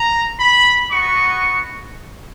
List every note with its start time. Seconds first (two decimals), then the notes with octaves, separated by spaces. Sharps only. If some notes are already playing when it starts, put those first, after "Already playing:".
Already playing: A#5
0.40 B5
0.91 B3 D#4 F#4 C#6